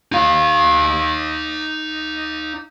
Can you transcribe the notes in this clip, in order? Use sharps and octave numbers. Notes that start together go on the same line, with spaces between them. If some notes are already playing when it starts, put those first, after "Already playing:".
D#4 F5